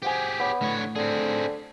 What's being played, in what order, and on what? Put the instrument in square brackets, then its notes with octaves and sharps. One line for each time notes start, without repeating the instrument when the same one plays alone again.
[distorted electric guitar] G4 G#4 [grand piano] C5 F#5 G#5
[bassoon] B3 [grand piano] C#5 D6
[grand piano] A2 [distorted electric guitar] D3 C#5
[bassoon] D3 [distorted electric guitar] C4 G#4